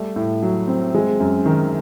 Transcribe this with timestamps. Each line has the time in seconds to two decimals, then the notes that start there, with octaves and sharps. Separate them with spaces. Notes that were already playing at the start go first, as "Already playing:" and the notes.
Already playing: G3 A3
0.16 A2
0.43 F#3
0.68 C4
0.94 G#3
1.20 F#2
1.46 D#3